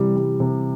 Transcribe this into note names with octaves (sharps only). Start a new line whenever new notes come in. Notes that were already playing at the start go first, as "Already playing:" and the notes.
Already playing: C3 E3 G3
G3
C3